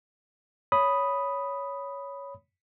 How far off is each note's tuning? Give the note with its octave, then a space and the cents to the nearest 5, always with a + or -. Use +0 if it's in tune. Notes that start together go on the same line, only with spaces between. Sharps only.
C#5 +10 B5 +0 D#6 +0